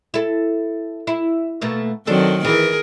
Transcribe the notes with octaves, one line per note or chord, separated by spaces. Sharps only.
E4 A4
E4
B2 A3 A#3
D#3 F#3 C4 D4 A4
E3 G#4 A#4